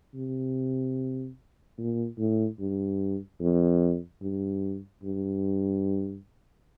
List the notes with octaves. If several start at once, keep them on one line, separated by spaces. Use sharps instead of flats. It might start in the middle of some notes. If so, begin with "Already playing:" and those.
C3
A#2
A2
G2
F2
G2
G2